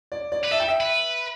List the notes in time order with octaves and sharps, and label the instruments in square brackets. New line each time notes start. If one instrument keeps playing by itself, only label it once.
[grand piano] D5
D5
[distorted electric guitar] B4
[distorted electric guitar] A4 [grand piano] E5
[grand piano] G5
E5
[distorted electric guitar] B4